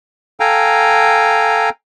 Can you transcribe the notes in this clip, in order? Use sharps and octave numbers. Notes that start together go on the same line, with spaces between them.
A4 F5 G5 G#5 A#5